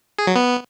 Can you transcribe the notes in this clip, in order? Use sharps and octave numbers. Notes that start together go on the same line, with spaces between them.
G#4
F#3
B3